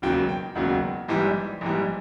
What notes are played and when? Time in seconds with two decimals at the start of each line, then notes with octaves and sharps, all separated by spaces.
0.02 E1 D#2 C#3 F#3 G5
0.29 G5
0.55 E1 D#2 C#3 F#3 F#5
1.08 A#1 G#2 E3 G3
1.61 A#1 G#2 E3 G3